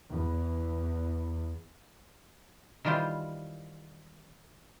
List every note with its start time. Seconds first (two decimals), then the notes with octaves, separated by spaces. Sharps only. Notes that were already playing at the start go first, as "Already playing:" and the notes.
0.10 E2
2.85 D#3 E3 G3 F4 C5